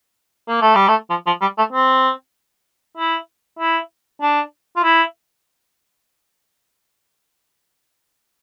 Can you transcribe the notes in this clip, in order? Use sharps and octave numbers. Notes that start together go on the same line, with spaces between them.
A#3
A3
G3
A3
F3
F3
G3
A3
C4
E4
E4
D4
F4
E4